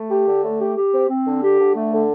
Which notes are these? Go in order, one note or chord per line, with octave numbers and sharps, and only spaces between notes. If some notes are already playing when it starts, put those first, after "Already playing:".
Already playing: A3
G4
D3
A3
G4
G4
C4
C4
D3
G4
D3
A3
D3